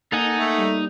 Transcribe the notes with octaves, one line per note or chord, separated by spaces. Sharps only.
A#3 D#4 A4 F#5 G#5
A3
G3